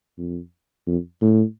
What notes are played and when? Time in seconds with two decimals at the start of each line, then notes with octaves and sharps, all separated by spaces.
0.18 F2
0.87 F2
1.22 A2